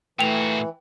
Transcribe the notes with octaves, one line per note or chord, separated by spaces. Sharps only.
A#2 E3 A3 F#4 G5 F7